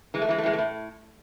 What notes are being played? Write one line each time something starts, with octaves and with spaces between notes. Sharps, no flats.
E3 G#3
A3
E3 G#3
A3
A2 G#3
A3
A2